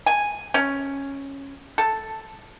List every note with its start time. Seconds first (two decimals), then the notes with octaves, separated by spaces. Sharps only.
0.06 G#5
0.54 C#4
1.78 A4